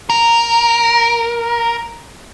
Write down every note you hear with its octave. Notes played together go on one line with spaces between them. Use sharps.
A#4